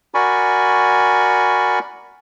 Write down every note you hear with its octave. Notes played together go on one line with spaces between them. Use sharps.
F#4 A#4 D5 G#5 B5 C#6